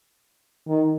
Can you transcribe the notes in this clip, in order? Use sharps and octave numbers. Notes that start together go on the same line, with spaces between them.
D#3